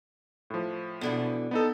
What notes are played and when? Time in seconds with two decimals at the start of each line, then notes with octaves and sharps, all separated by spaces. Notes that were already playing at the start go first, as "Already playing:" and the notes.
0.50 A2 F3
1.01 B2 D3 E3
1.51 B3 D#4 A4